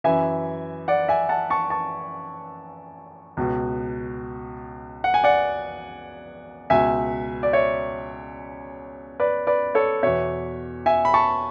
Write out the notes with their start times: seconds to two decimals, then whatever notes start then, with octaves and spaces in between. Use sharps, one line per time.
0.04 F#2 E3 E5 G#5
0.88 D5 F#5
1.08 E5 G#5
1.29 F#5 A5
1.50 A5 C#6
1.70 A5 C#6
3.37 C#2 B2
5.04 F#5
5.14 G#5
5.24 D5 F#5
6.70 C#2 B2 E5 G#5
7.43 D5
7.53 C#5 E5
9.20 B4 D5
9.47 B4 D5
9.75 A4 C#5
10.03 E2 B2 C#5 E5
10.86 E5 G#5
11.05 B5
11.14 A5 C#6